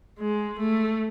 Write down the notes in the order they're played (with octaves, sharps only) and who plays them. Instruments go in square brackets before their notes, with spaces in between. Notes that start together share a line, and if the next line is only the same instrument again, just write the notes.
[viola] G#3
A3